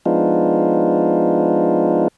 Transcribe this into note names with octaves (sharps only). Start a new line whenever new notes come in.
F3 G#3 B3 D4 D#4 F4